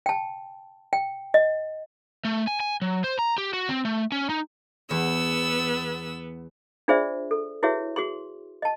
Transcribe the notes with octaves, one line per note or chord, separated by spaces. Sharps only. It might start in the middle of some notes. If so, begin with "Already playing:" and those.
G5 A5
G5
D#5
A3
G#5
G#5
F#3
C5
A#5
G4
F#4
C4
A3
C#4
D#4
E2 B3 E6
D4 F4 G#4 C5 D5 E5
A4
E4 F#4 G#4 B4 C#5 E5
F#4 G#4 C6
D#5 A5